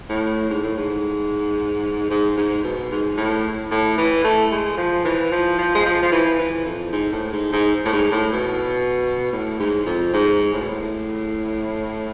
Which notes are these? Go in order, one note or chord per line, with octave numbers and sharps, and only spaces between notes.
A2
G#2
A2
G#2
G#2
G#2
B2
G#2
A2
A2
E3
A3
G#3
F3
E3
F3
F3
G#3
F3
F3
E3
E3
F2
G#2
A2
G#2
G#2
A2
G#2
A2
B2
A2
G#2
F2
G#2
A2
B2
A2